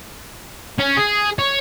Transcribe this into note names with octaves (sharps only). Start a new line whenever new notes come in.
C#4
G#4
C#5